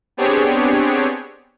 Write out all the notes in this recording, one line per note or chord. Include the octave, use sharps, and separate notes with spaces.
B3 C4 D4 G4 G#4 C#5